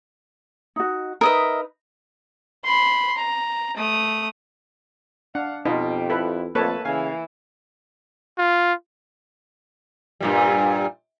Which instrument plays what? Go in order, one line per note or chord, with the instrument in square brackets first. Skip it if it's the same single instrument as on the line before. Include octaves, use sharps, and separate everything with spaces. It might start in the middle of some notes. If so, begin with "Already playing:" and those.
[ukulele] D#4 F#4
[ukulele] D#4 B4 [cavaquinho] A#4 D#5 E5
[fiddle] B5 C6
A#5
A3 D#6
[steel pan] D4 [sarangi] F5 [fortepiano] F#5
[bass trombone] F2 [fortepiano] B2 [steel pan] D#4 F4 [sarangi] G4
[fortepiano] E4 [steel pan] A4 B4
[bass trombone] F2 [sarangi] A3 [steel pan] A#3 A4 C#5 [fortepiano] B4 A5
[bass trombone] C#3 [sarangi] E3 [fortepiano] F5 G#5
[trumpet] F4
[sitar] G2 A#2 G3